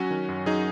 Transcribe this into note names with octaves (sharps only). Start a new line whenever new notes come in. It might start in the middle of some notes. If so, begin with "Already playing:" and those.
Already playing: F#3 C#4 F#4
D#3
F#2
F#3 D#4 G#4